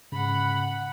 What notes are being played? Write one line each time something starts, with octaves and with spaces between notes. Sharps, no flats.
G#2 C#3 F#5 B5